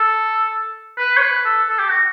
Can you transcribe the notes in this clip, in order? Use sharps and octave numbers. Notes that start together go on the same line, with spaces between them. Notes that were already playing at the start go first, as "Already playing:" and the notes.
Already playing: A4
B4
C#5
B4
A4
A4
G4
F#4